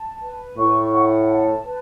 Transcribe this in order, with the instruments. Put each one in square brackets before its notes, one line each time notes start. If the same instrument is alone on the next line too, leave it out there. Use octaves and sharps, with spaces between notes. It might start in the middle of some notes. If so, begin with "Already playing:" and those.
Already playing: [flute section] A5
B4
[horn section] A2 [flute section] C#6
[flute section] F#5
A5
B4